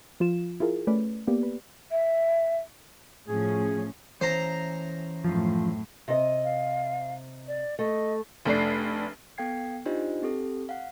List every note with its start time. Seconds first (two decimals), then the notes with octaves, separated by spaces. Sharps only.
0.20 F3 F4 E7
0.60 E4 F4 G#4 A#4
0.87 A3 C#4 B4 D5
1.27 A#3 B3 G4 D5
1.43 B4
1.91 E5
3.28 A2 F3 C#4 G#4
4.21 E3 C#4 C5 C#5 A#5
5.24 F#2 A2 F3
6.08 C3 D#5
6.44 F5
7.48 D5
7.79 A3 D#5
8.45 F1 A3 D4 C7
9.38 B3 A4 F5 G5 G#6 C7
9.86 D4 D#4 F4 G4 C5 D#5
10.22 C4 G4 A4
10.69 F5 F#5